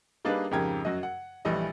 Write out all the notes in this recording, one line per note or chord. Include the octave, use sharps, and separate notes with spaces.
G3 A#3 D4 D#4 G#4 B4
F2 G#2 C#3 G4 A#4 G#6
F#2 F#4 D#5
F#5
A#1 E3 G3 A3 D#5